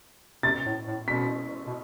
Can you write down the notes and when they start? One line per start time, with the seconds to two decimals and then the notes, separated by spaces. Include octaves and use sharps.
0.43 C3 A6
0.66 A2
0.87 A2
1.08 B2 B6
1.67 B2